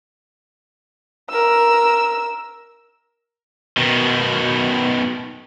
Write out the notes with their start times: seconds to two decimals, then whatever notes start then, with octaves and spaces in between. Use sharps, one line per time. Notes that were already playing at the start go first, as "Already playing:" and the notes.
1.30 A#4 E6
3.78 B2 D#3